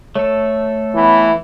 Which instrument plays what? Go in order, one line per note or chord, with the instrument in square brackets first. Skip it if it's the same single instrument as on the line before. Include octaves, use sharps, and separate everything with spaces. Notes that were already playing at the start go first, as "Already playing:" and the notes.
[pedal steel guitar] A3 A4 [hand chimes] C#5
[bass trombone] E3 [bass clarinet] B3